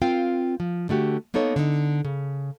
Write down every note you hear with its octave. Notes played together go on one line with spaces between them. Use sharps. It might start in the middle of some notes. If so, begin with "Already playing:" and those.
C4 F4 A#4 F5 G5
F3
D3 A3 F#4 G4
A#3 B3 D#4 A4 C#5
D3 D#4
C#3